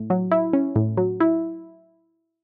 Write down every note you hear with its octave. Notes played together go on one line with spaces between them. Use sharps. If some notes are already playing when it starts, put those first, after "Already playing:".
Already playing: A2
F#3
E4
C#4
A2
F#3
E4